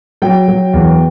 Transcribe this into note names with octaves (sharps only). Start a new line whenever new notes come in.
F#3 G5
F#3
E2